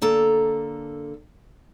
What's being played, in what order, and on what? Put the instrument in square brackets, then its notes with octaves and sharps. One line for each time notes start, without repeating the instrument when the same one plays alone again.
[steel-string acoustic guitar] D3 A#3 A4 A#5